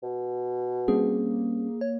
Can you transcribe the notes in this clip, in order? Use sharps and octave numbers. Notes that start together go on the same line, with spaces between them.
B2
G3 A#3 C4 C#4 G#4
C#5